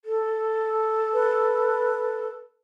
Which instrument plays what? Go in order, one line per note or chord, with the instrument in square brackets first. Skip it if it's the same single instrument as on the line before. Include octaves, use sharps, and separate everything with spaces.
[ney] A4
[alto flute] B4